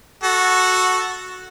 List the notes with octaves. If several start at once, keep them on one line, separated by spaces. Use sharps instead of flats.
F#4 A4